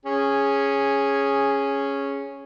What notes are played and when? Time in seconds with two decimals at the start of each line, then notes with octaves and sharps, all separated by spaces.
0.06 C#4 G#4